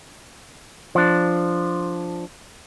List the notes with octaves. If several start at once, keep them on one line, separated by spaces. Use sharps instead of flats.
F3 D4